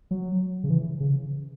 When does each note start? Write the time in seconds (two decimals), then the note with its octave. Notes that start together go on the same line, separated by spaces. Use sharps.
0.11 F#3
0.64 C#3
0.70 E3
1.00 C#3